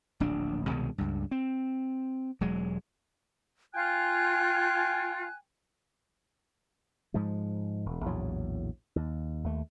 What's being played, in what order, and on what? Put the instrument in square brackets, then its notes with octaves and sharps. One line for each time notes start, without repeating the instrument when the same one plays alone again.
[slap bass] D1 A#1 D4
C2 B2 D#3 G#3
C#2 G2
C4
E1 F#3 G#3
[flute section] F4 [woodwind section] G5 G#5 [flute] F#6
[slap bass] G#2 F3 G#3
E1
A#1 E2 A2 F#3
D#2
D#2 A3